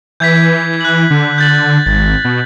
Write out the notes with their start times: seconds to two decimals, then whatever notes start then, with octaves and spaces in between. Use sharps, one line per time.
0.20 E3 G6 G#6 B6
0.81 F#6 F#7
1.10 D3
1.38 G6 A6 F#7
1.86 G#1 A6
2.25 B2